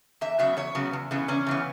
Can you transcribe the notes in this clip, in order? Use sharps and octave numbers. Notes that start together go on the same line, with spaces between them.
E2 E5
C#3 F#3 B3 E5
E2 C#5
C#3 F#3 B3
E2
C#3 E3 B3
E2 C#4
C#3 E3 B3